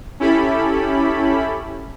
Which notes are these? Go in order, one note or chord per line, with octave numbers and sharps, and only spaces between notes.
C#4 E4 G4 A4 B5